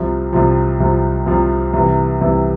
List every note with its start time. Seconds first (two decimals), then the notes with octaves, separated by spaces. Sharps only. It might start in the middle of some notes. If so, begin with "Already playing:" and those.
Already playing: C2 C3 F3
0.33 C2 C3 F3
0.80 C2 C3 F3
1.26 C2 C3 F3
1.73 C2 C3 E3
2.21 C2 C3 E3